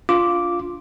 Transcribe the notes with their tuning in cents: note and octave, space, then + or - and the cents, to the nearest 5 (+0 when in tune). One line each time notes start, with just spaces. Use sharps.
D4 -30 F4 +0 D6 -5